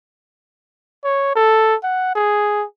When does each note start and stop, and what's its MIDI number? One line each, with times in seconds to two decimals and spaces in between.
1.04 1.32 73
1.36 1.75 69
1.83 2.12 78
2.15 2.65 68